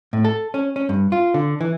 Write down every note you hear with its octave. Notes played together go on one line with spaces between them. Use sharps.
A2
A4
C#4
C#4
G2
F4
D3
E3